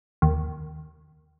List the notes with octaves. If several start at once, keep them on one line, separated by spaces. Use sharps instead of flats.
D#2